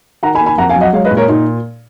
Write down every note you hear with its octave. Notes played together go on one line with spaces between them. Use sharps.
D#3 F#5 A#5
G#5 B5
A#3
G#5 B5
F2 F#5 A#5
F5 G#5
F#3
D#5 F#5
G#3 C#5 F5
B4 D#5
A#2
A#4 C#5
A#2 D#4